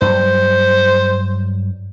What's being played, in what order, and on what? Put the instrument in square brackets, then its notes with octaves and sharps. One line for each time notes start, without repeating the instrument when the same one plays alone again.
[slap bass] G2 F#3 [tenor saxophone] C5